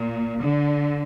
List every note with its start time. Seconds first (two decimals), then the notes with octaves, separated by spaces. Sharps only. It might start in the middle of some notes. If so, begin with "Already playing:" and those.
Already playing: A#2
0.41 D3